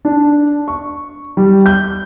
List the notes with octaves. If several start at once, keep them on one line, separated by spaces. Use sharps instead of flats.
D4
C#6
G3
G6